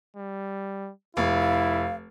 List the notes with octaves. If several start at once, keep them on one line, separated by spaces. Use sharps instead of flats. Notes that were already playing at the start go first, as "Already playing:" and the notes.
G3
F1 E4 F5